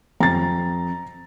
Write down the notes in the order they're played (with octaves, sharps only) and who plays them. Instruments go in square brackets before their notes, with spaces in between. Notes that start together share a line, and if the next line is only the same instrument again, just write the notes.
[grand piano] F2 [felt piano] A#5 A6